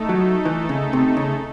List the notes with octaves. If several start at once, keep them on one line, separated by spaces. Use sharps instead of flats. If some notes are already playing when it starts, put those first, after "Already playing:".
Already playing: A3 D#4 A4
F#3
E3
C#3
C3
C#3